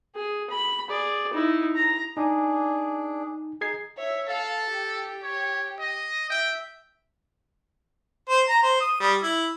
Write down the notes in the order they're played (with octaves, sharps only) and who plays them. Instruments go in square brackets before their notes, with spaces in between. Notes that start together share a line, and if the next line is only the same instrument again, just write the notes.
[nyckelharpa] G#4
B5
G#4 D5
D#4 E4
A#5
[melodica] D4 G#4 [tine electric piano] D#4 G#5
[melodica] D#4 [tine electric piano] G#4 G#6 C7
[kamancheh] C#5 E5
[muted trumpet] A4 [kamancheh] F5 A5
[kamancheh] G4 G5
[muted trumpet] C#5
D#5
[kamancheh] E5 [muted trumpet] G5
[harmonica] C5
A#5
C5
D#6
G3
E4